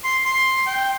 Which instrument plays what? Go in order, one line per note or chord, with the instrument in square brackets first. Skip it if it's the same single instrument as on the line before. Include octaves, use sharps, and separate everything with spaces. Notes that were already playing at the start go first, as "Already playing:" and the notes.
[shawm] C6
C6
G5